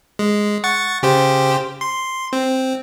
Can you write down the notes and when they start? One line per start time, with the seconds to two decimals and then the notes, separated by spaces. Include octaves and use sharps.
0.19 G#3
0.64 F#5 C#6 A6
1.03 C#3 G4 C5
1.81 C6
2.33 C4